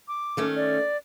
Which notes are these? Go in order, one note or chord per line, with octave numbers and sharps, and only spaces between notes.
D6
D#3 A3 C#4
D5